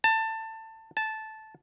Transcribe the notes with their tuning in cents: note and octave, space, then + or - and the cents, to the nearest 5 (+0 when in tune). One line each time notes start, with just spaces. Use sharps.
A5 +20
A5 -10